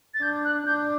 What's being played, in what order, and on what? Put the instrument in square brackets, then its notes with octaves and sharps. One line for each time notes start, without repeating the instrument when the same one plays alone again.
[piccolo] A6
[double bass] D4 [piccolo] G6
[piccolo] F#6
[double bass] D4 [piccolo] G6